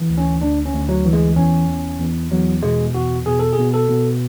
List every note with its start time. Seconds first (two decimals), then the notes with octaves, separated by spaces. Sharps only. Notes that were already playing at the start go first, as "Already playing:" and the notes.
Already playing: E3
0.10 D2
0.18 C#4
0.41 D2 D4
0.66 C#4
0.73 D2
0.89 F#3
1.05 E3
1.13 G#3
1.36 E2 C#4
1.68 E2
1.99 E2
2.31 E2 F#3
2.62 B2 G#3
2.95 E2 F#4
3.26 B2 G#4
3.39 A4
3.53 G#4
3.58 B2
3.74 A4
3.89 B2